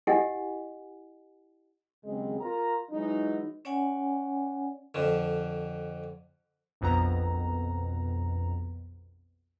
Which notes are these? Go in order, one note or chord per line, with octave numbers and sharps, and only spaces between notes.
E4 G4 D#5 F#5 G#5
D#2 C#3 F#3 G#3 C4
F4 A#4 A#5
E3 F#3 G#3 D#4
C#4 C#5 D5 F#5 G#5
F2 D3
A#1 F2 B2 A#5